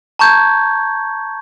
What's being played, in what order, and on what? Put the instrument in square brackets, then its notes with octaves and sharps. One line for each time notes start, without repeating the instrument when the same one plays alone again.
[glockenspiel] A5 A#5 C#6 G6 G#6